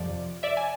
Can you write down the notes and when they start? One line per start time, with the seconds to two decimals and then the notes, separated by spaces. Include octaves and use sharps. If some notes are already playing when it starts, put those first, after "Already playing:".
Already playing: F2 C3 F3 D5
0.43 D5 E5
0.57 G#5